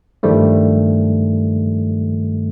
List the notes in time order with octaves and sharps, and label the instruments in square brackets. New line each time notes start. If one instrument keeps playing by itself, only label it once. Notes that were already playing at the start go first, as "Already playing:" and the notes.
[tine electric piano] G2 D#3 F3 G3 A3